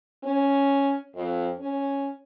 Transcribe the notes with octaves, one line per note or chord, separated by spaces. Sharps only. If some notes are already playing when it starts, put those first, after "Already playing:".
C#4
F2
C#4